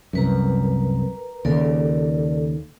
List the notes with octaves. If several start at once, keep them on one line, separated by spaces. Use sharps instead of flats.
C2 F#2 A#4 B4 A#5
D#2 C#3 A4 A#4 D5